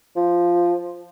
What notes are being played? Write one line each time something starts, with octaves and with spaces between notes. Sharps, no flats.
F3